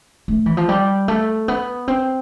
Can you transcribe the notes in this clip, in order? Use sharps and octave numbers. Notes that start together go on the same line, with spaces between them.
A3
E3
F3
G3
A3
B3
C4